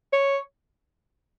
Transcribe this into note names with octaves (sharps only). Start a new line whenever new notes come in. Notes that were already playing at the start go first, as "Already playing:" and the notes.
C#5